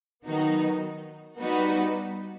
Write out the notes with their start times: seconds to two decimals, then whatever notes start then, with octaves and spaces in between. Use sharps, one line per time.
0.25 D#3 F#3 B3 D#4 F#4
1.38 G3 B3 D#4 F#4 B4